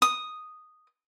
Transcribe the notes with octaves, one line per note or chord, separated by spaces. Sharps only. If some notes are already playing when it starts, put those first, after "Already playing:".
D#6